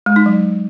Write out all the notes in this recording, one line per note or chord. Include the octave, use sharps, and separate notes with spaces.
G#3
D#4
F#3